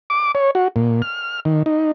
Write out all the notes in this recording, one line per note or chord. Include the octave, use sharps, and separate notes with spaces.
D6
C#5
F#4
A#2
F6
D#3
D#4